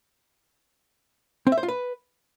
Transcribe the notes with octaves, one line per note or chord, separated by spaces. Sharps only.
C4
E5
C5
F4
B4